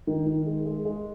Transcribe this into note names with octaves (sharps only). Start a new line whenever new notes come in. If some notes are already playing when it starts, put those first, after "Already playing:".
D#3
D#3
G#3
G#3
G#3